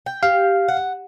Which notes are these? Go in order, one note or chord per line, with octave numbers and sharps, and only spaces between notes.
G5
G4 F5
F#5